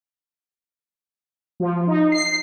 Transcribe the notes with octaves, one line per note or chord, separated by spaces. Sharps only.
F3
D#4
C7